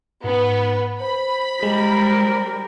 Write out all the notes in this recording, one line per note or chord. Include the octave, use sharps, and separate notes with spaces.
G#2 B3 B4
C5 B5
G3 G#3 A#4